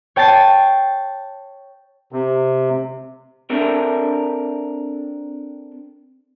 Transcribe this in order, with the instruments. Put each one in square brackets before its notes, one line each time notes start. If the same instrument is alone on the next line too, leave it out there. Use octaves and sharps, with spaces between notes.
[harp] C#5 G5 A5 A6 C7
[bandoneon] C3
[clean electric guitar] C4 D4 A4 A#4 E5